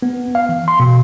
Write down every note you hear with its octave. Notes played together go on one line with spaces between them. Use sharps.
B3
F5
E3
C6
B2